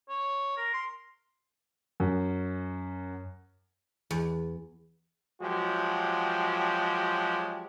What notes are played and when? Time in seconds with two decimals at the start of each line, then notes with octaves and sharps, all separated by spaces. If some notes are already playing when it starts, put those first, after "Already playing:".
0.09 C#5
0.57 A#4
0.74 C6
2.00 F#2
4.11 E2
5.42 F3 F#3 G#3 F#4 G4